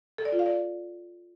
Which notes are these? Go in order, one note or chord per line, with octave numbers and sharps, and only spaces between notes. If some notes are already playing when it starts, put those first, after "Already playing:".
A4
D5
F4
F5
D5